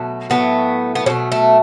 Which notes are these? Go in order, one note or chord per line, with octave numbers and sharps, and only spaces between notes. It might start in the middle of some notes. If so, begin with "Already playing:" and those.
Already playing: B2 F#3 A3
A2 F#3 A3 B3
B3
B2 F#3 A3 C#4
A3